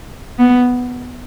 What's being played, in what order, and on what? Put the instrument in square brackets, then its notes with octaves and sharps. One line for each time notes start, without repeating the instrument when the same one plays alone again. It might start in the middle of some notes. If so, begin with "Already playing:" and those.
[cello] B3